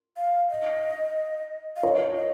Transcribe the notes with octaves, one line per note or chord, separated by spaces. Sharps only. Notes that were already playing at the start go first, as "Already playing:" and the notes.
F5
D#5
F5
C#5 D#5
D#5